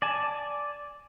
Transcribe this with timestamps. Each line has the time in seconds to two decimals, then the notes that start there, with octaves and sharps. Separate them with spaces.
0.02 D5 G#5 A5